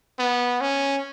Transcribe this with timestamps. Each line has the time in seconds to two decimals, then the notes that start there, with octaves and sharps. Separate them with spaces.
0.19 B3
0.61 C#4